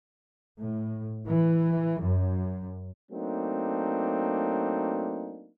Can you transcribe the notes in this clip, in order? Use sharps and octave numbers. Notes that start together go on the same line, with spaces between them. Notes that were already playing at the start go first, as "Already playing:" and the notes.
A2
E3
F#2
F#3 A3 A#3 C4 D4 D#4